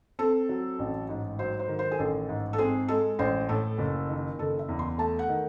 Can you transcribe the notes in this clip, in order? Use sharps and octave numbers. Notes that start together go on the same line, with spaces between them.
C4 A4
F#3
A1
G#2
F#3 C5
C5
D#3
C5
G#4
A1 A4
G#2
A4
C4 G#4
G#3 A4
A1 C5
A2 A4
F#1
D#3
F#1 A4
E5
E2
C6
A3 A5
F#5
D#3